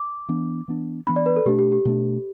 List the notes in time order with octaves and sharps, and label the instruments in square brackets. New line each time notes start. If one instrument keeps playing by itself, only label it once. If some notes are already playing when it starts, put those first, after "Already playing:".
Already playing: [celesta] D6
[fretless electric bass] E3 B3 D4
E3 B3 D4
[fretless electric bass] E3 B3 D4 [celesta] B5
[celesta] D5
B4
A4
[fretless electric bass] B2 A3 D4 [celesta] G4
[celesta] G4
G4
[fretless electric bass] B2 A3 D4